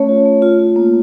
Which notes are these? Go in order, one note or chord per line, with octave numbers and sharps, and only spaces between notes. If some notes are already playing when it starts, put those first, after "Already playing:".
Already playing: A3 C#4 C#5
F4
A3
F4
F4
A#3